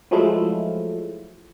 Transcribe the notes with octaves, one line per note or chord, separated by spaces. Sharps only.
F3 F#3 G#3 A3 E4 F4